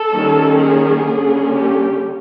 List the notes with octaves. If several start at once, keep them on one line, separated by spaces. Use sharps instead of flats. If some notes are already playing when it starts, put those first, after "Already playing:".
Already playing: A4
D#3 G3 A#3 C#4
G#4
D3 G3 A#3 C#4
G4